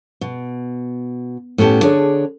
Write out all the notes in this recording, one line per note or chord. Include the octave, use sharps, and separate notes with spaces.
B2
A2 B3 C#4 G4 A5
D3 D4 G#4 C#5